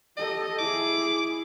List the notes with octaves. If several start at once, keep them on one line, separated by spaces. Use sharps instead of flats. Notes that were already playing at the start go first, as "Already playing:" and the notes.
G4 A4 D#5
E4 G#4 D6